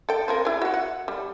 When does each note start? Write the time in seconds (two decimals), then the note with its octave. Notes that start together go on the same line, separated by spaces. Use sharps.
0.09 A4 G5
0.28 C4 F4 A#4
0.45 E4 G#4
0.62 F#4 F#5
0.74 F#5
1.08 G3